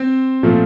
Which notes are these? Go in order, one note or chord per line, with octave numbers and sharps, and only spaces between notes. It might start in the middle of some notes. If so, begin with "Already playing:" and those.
Already playing: C4 C5
A#2 F3 A3